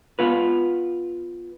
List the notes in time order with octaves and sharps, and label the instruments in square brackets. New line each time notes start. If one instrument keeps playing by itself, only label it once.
[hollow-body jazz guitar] B3 F4 B4